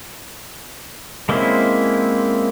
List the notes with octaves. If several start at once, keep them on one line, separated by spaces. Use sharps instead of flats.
G#3 A#3 C4 C#4 E4